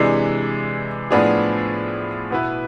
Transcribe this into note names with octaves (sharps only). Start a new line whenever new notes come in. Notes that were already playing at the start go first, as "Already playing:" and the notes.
Already playing: C3 E3 G#3 D4
A2 F3 B3 D4 G#4
B2 B3 E4 B4